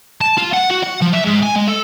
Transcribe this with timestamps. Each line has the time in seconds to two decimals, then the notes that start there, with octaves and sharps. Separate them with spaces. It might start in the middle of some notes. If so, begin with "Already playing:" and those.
0.21 A5
0.38 F4
0.54 F#5
0.71 F#4
0.84 F#5
1.02 F3
1.13 E5
1.25 G#2
1.43 G#5
1.56 G#3
1.68 A4